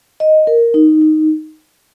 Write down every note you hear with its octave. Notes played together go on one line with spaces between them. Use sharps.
D#5
A#4
D#4
D#4